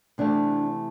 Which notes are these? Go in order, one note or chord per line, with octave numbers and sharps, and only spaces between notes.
C3 E3 A3 D4